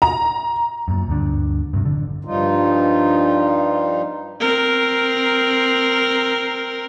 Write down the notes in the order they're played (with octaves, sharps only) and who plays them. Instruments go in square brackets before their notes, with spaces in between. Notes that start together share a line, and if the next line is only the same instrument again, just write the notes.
[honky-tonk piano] A#5
[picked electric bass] F#2 A#2
D2 G2 D3
G2 C3 F#3
A1 D3
[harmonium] G2 F3 G3 D#4 F4
[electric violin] C4 A#4